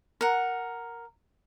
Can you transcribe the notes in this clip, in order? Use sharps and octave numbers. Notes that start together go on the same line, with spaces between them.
A#4 F#5